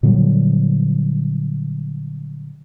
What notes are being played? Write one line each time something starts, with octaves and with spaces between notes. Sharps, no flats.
A#2 D3 F#3 G3